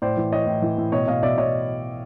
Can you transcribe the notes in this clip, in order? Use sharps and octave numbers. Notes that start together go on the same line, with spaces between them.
A2 C5 D5
E3
E3 C#5 D#5
A2
E3
A2
B2 C#5 D#5
B2 D#5 F5
B2 D5 E5
B2 C#5 D#5